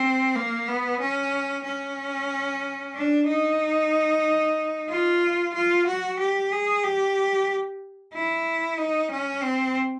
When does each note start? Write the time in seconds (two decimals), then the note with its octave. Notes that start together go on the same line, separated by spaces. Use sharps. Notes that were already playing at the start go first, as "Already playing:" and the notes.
Already playing: C4
0.35 A#3
0.68 B3
1.01 C#4
1.65 C#4
2.95 D4
3.27 D#4
4.89 F4
5.54 F4
5.87 F#4
6.19 G4
6.52 G#4
6.84 G4
8.14 E4
8.78 D#4
9.11 C#4
9.43 C4